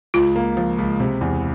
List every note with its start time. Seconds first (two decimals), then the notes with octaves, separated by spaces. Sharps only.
0.14 C#2 F4
0.36 A#3
0.57 F3
0.78 C#2
1.00 C3
1.21 E2